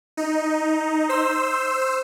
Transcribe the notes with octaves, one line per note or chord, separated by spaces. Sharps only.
D#4
C5 E6